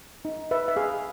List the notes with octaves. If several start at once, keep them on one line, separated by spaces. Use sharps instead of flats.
D#4
B4 E5
E5
G#4 F5